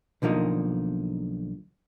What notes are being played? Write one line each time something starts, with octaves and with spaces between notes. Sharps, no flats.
B1 D3 F3 A#3 D#4